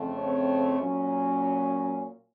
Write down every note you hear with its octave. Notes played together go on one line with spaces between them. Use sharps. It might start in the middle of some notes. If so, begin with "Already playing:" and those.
Already playing: F2 C#3 F3 A3 C4
C#5
A#2 F#3 A#3 C#4